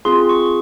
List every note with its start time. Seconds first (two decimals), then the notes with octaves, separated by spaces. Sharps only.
0.05 C4 F4 G#4 C6
0.29 C#6